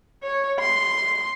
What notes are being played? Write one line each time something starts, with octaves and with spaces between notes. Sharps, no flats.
C#5
C6